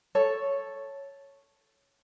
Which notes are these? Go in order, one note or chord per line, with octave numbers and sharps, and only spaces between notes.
A4 C#5